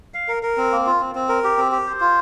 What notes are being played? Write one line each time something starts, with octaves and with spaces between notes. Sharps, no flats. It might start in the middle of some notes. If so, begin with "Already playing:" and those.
F5
A#4
A#4
C4
A#3
F4
C4
C4
A#4
G4
C4
G4
C5
F4